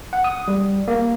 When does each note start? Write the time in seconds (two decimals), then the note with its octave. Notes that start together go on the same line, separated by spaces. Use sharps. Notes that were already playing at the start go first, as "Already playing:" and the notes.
0.13 F#5
0.24 D#6
0.48 G3
0.88 A#3